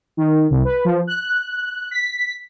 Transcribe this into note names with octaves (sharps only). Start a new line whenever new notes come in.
D#3
C2
B4
F3
F#6
B6